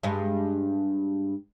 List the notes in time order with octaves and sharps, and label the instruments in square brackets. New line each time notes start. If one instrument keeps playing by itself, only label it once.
[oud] G2 G#3